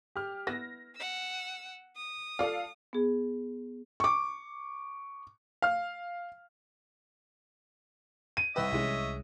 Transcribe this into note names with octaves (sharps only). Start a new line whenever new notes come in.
G4 F6
B3 E4 A#6
F#5 E6
D#6
F4 A4 D5 F5
B3 G#4
C#6 D6
F5 F6
D#7
C2 G4 B4 C#5 D#5 E5
C2 E3 G#3 C#4